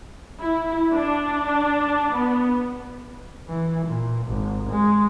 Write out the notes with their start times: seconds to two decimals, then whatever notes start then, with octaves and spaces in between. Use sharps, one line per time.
0.41 E4
0.94 D4
2.15 B3
3.48 E3
3.86 A#2
4.27 G#1
4.70 G#3